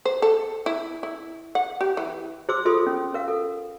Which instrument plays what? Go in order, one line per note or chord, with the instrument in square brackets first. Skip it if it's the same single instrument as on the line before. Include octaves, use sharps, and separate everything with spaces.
[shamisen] C5
A4
E4
E4
F#5
G4
E3
[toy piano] G#4 C5 C6 D6 E6
F4 A4 C6 D#6
C#4
A#4 F5
A4